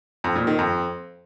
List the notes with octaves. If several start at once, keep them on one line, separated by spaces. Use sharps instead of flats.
F2
A#2
D#3
F2